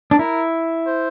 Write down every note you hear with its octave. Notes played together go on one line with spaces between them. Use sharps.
D4
E4 A#4
C5